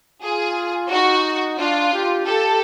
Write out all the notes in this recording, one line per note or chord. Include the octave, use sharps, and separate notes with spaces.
F4 G#4
D#4 F#4
D4 F4
G4
G4 A4